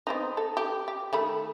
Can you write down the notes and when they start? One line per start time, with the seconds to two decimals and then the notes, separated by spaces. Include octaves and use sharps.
0.07 B3 C4 D#4
0.37 A4
0.57 G4
0.88 G4
1.13 D#3 A3 B5